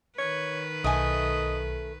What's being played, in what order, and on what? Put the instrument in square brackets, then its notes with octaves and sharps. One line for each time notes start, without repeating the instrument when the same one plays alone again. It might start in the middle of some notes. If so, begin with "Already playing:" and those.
[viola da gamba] D#3 B4 [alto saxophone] C#5
[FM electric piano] B1 [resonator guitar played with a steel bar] A3 G#5 [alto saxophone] D#5